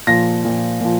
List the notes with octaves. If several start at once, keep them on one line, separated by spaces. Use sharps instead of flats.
A#2 F3 A#6
A#2 F3
A#2 F3